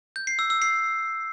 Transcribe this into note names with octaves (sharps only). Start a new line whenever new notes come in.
G6
C7
E6
E6
C7